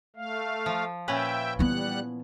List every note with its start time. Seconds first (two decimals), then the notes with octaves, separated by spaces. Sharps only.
0.16 A3 F5
0.66 F3
1.08 A#2 C#4 B4 E5 G5
1.59 E3 G3 B3 F#5 F#6